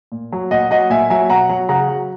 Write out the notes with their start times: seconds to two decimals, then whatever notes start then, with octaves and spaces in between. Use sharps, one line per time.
0.12 A#2
0.32 F#3
0.51 A#2 D#5 F#5
0.71 F#3 D#5 F#5
0.90 A#2 E5 G#5
1.10 F#3 E5 G#5
1.30 B2 F#5 A#5
1.49 F#3
1.69 C#3 F#5 A#5
1.88 F#3